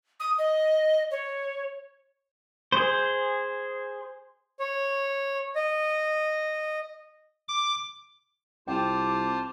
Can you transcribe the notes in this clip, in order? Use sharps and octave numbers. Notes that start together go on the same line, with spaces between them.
D#6
D#5
C#5
G#4 C5
C#5
D#5
D6
C2 F4 C5 G5 A5 D6